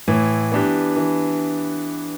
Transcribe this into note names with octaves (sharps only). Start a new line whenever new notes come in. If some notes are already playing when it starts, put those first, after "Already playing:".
A2 E3
B3 D4 G4
E3